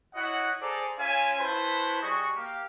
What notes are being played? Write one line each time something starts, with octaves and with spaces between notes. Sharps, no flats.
E4 F#4 C#5 D#5 F#5
G#4 A4 C5 D5 A#5 D6
C#4 F4 E5 F5 G#5
E4 F#4 B4 C5 A5 B5
G3 F#4 G#4 D#5 C#6
A#3 G4 F5